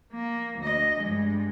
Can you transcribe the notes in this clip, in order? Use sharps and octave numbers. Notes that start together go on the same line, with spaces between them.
A#3
D2 D#5
G2 G#3